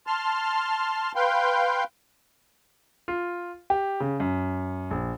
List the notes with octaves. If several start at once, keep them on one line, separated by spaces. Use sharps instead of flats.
A5 C6 F6
B4 F5 G5 C6
F4
G4
C#3
F#2
A#1